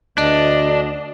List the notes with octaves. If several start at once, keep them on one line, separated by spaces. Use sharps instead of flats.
D2 D4 D#5